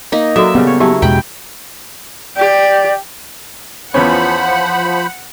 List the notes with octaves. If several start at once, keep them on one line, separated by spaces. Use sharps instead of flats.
A#3 D#4
F#3 F#4 A4 D5 E5
C#3 G3 B3
C#5
F#3 E4 G4 C#5 A5
E2 B2 G#3 G5 B5
G4 D5
E2 F3 B3 C#4 C5 F#5 B5